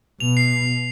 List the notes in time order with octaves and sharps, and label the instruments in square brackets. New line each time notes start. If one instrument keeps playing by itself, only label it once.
[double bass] B2 [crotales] F7
[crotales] C7